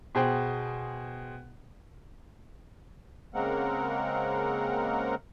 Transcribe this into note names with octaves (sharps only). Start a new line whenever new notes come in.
B2 G#4 C5 G5
C#3 G#3 A#3 C4 A#4 F#5